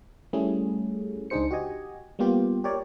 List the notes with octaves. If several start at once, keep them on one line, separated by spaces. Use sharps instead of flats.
G3 A3 C#4 E4 G#4
C#2 D4 D#4 G#4 C5 C#7
F#4 G4 D#5 G#5
G3 A#3 B3 F4 G4
G4 A#4 C#5 D5